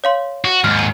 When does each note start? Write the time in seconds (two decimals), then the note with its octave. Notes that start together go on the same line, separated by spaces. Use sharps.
0.04 C#5 F5 C6
0.45 F#4
0.64 D#2 G#2 F6
0.79 D#7